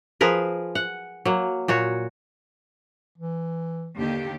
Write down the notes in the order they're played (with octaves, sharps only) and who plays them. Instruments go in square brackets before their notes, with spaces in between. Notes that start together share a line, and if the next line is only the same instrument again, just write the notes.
[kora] F3 G#4 A#4 B4
F#5
F#3 A#3
A#2 F#4 C#5
[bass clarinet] E3
[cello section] D#2 D3 G4